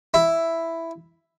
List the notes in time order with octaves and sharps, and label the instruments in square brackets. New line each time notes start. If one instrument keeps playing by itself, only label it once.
[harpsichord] E4